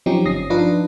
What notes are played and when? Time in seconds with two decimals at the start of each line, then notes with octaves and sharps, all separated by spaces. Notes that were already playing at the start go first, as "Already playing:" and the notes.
0.06 F3 F#3 C4 C#4 D#4 G4
0.25 G1 C#4 D#6 A#6 C7
0.50 F3 D4 D#4 F4 B4